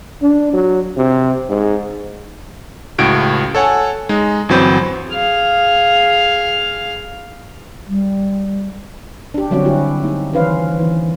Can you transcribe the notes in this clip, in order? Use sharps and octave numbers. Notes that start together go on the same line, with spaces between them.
D4
F#3
C3
G#2
C#2 A2 F#4 G#6 D7
A4 C#5 F#5 G#5 A5
G#3 D#4
G1 E3 F#3 C4 B5 G6
G#4 F5
G3
D4 G4
D3 F#3 G3 C4 C#4 F#4
E4 F#4 G4
A#3 D#4
D#3 E3 C#4 B4 C5 F5
E3